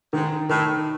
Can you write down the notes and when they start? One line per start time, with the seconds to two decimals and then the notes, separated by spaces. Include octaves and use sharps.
0.13 G#2 D#3
0.50 A2 D#3